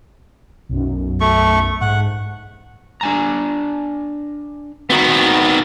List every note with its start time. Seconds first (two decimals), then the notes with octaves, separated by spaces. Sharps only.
0.69 B1 F#2
1.21 A3 C#6
1.81 G#2 F#5
3.01 D4 G#5 A#5
4.90 D#3 B3 C4 F#4 A#5